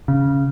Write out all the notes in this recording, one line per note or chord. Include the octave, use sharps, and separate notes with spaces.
C#3